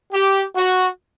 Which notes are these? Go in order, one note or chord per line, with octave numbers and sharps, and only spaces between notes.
G4
F#4